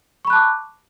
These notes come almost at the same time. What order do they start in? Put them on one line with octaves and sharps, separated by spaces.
C#6 B5 F#6 A5 D6